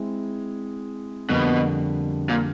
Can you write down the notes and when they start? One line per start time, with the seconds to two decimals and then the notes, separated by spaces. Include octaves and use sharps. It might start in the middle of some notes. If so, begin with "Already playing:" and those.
Already playing: G#3 C4 E4
1.29 F2 B2 D3 G3 A#3
2.29 A#2